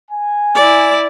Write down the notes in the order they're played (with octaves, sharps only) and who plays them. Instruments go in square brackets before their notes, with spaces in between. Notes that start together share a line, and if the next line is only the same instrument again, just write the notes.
[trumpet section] G#5
[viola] E4 D5